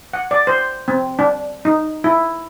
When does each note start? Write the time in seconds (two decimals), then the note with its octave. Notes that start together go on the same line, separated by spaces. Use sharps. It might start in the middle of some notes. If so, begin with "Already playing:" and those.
0.13 F#5
0.31 D5
0.47 C5
0.88 C4
1.19 D4
1.65 D#4
2.04 E4